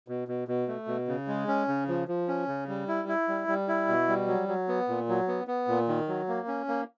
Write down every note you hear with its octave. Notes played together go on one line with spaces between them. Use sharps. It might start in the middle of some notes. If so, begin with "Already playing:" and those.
B2
B2
B2
A3
B2
C#3
G#3
C#4
C#3
F3
F3
C#4
C#3
G3
E4
E4
G3
G3
E4
B2
G3
F#3
F#3
B3
A#2
F#3
B3
B3
A#2
D#3
F#3
A#3
C#4
A#3